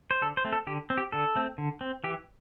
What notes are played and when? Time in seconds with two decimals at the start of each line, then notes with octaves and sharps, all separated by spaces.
0.11 C5
0.22 D3 A4
0.37 C5
0.45 A3 C4
0.53 A4
0.67 D3 G4
0.90 C4
0.97 G4
1.12 D3 A4
1.36 A3 C4
1.58 D3
1.81 C4
2.04 E3 G4